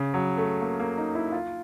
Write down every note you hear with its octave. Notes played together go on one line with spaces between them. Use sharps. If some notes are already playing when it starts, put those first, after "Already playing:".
Already playing: C#3
F#3
A3
A#3
A#3
D#4
E4
F4